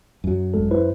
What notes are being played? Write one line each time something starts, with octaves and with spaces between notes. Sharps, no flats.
F#2 F#3
G#1 G#3 A4
E4 B4 C5